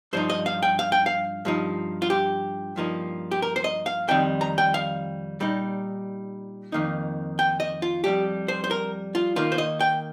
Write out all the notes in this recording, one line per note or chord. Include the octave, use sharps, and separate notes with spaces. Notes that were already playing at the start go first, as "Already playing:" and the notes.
G2 F3 D#4 C5
D#5
F5
G5
F5
G5
F5
G2 F3 D#4
F4
G4
G2 F3 A#3 D#4
G4
A#4
C5
D#5
F5
F2 D#3 G3 C4 D#4 G5
A#5
G5
F5
A#2 G3 D#4
F2 D#3 A#3 D#4
G5
D#5
F4
F2 C3 G3 G4
C5
C5
A#4
F4
D#3 A#3 D#4 F4
C5
D#5
G5